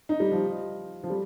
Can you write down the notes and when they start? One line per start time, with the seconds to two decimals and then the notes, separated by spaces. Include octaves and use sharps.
0.09 D#4
0.20 G3
0.31 F3
1.04 F3
1.10 G3